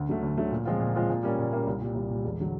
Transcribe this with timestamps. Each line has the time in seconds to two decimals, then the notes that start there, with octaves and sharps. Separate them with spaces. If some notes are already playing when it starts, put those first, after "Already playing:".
Already playing: D2
0.09 D3 F#3 A3
0.22 D2
0.37 D3 F#3 A3
0.51 A#2
0.66 F3 G#3 C4 F4
0.80 A#2
0.95 F3 G#3 C4 F4
1.10 A#2
1.23 G3 A#3 C#4
1.39 A#2
1.52 G3 A#3 C#4
1.67 C2
1.80 A#2 G3
1.95 C2
2.10 A#2 G3
2.24 E1
2.40 D3 F#3